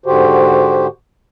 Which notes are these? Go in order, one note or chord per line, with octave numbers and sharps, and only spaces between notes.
G#2 D3 F#4 G4 C5